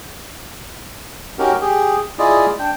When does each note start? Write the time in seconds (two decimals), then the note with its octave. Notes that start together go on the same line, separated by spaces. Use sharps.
1.39 C#4 D#4 F#4 G4 A#4
1.61 G4 G#4
2.19 E4 F4 G#4 D5 D#5
2.59 D4 G5